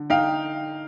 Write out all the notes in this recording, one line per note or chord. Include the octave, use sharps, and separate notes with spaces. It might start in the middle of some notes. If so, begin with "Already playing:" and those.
Already playing: D3
D#4 F5 G5